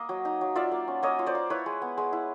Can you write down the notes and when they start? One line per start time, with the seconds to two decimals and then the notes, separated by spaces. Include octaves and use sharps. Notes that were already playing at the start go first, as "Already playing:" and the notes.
Already playing: A#3 D#5
0.09 F#3
0.25 D#4
0.41 F#3
0.56 F4 D5 E5
0.72 A#3
0.88 C#4
1.03 A#3 C#5 D#5
1.19 F4
1.26 C5 D5
1.35 A#3
1.50 E4 B4 C#5
1.66 G#3
1.82 B3
1.97 G#3
2.13 E4